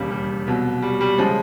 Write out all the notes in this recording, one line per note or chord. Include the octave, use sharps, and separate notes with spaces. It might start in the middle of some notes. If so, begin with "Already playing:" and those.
Already playing: E1 D#2 C#3 G3
G3
C2 B2 F#3
G3
G3
C#3 F3 G#3